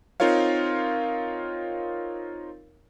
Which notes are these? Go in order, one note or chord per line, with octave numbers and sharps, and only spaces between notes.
C4 D#4 F4 A#4 C#5 F5